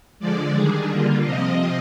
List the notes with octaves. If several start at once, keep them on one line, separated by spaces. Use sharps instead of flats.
D3 F3 G#3 D5
D#3 G3 D4 G#4
D3 G3 A#3 F4
C3 F3 C4 D#5